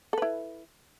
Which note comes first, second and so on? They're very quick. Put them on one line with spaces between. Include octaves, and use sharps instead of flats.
A4 B4 E4